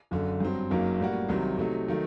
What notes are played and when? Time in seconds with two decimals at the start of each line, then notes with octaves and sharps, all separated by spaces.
0.11 F#1 F#2 D3
0.40 G2 F#3 C4
0.71 F#1 F#2 F#3 A#3 D#4
1.00 A2 G3 A#3 F#4
1.29 C2 C3 D#3 F#3
1.58 C3 F#3 A3 D#4
1.88 D#3 F#3 A3